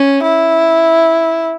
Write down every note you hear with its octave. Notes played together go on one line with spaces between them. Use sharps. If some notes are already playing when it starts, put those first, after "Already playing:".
Already playing: C#4
E4